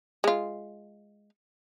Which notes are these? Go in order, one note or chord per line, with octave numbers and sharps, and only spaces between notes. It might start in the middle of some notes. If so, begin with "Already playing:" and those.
G#3 F4